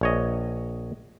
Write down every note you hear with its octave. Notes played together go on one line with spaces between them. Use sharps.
A#1 C#5 D#5